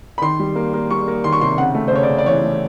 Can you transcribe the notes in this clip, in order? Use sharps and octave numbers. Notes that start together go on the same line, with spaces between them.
B5
D#3 C6
G3
A#3
A#3
G3 C#6
A#3
D#3 C6
C#6
C3 C6
C#3 F#5
A3
C5
C#3 C#5
D5
C#3
D5
E3 C#5
A3